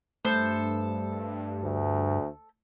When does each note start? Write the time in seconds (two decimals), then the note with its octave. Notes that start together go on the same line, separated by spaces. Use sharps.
0.25 G2 A3 A4 C5
1.64 D2